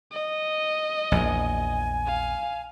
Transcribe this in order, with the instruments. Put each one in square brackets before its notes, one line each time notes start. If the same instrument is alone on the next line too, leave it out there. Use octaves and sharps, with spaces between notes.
[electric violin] D#5
[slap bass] A#1 E2 [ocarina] G#5
[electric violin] F5